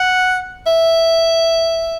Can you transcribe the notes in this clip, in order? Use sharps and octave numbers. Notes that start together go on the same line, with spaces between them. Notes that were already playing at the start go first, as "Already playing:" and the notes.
Already playing: F#5
E5